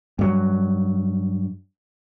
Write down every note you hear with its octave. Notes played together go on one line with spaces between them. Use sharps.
G2 F#3